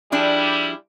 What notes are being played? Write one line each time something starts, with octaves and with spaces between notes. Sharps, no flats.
F3 G3 D4 E4 G#4